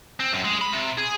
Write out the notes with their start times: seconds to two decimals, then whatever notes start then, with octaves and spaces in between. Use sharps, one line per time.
0.20 C4
0.33 F#2
0.44 G#3
0.61 B5
0.73 C3
0.98 G#4